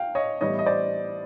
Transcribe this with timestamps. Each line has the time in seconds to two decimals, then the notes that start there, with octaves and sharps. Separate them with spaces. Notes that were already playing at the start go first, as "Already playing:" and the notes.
Already playing: F5 G5
0.15 C#5 D#5
0.41 A2 E3 G3 B3 E4 C#5 D#5
0.59 D#5
0.66 C5 D5